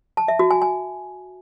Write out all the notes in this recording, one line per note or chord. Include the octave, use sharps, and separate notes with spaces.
A5
E5
F#4
G#5
G#5